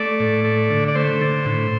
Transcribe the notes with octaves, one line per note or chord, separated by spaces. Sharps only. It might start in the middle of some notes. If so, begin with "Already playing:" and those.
Already playing: A3 D5
A2
A3
D3
D5
A3 C5
D3
A2